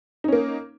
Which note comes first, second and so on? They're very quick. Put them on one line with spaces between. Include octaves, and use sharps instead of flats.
D#4 C#4 A#3